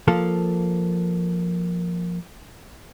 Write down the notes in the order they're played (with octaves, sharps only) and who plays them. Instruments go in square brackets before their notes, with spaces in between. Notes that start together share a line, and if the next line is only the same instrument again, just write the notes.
[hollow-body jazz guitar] F3 A#3 A4